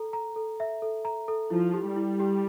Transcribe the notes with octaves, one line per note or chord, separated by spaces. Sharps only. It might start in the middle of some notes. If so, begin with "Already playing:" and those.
Already playing: A4 A#5
A#5
A4
E5
A4
A#5
A4
F3 E4
G4
G3
E4
G4